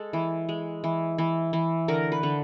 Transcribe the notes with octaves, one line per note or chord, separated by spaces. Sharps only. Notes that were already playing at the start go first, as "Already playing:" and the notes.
Already playing: G#3 A4
E3
G#3
E3
E3
E3
D3 A#4
B4
D3